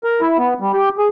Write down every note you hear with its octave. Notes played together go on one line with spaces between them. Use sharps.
A#4
E4
B3
G3
G4
G#4